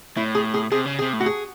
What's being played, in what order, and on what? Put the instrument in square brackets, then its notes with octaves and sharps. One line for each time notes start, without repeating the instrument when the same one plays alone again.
[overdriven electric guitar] A2 [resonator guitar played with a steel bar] E4
[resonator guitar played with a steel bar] G#4
G#4
[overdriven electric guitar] C3 [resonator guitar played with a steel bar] G#4
[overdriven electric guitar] C#3
[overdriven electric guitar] C3 [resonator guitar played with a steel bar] G#4
[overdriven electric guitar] A2
[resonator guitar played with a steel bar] F#4
G#4